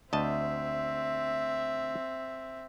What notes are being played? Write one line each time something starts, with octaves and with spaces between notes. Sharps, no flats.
D2 C4 D#5 E5 A5